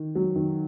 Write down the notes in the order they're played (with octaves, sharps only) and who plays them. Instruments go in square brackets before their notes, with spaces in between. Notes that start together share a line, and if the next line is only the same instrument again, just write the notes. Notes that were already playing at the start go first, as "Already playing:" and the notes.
Already playing: [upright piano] D#3
F#3
D#3